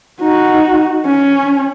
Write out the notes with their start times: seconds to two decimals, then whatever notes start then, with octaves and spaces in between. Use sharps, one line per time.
0.21 D#4 F#4
1.06 C#4